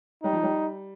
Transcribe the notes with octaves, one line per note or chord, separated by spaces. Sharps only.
G3 D#4
F3
G3